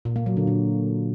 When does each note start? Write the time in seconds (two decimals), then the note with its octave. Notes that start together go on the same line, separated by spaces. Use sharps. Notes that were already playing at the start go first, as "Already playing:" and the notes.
0.05 A#2
0.16 A#3
0.26 F#3
0.37 D3
0.47 A#2